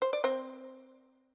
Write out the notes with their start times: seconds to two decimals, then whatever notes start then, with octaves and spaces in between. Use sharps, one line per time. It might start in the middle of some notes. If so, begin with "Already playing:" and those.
0.02 C5
0.13 D5
0.24 C4 C5